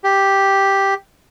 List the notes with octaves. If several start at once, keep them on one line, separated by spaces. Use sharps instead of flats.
G4